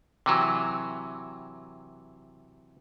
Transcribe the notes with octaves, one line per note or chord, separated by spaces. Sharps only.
C3 E3 F#3